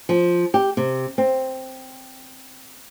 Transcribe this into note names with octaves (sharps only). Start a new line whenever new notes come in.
F3
G4
C3
C4